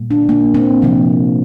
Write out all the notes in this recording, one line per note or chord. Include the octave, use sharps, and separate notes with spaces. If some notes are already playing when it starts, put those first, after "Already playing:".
Already playing: A#2 G3 A#3
D4
A#3
C4
C3 F3 A#3